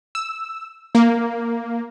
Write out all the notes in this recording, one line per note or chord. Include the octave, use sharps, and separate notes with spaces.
E6
A#3